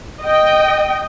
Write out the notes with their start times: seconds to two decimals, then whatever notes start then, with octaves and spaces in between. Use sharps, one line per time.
0.22 D#5 G5